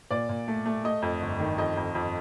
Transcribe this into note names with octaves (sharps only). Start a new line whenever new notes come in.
A#2 D5
A#2
A3
A3
A3 D#5
F2
G1
D#3
F2 D#5
F2
F2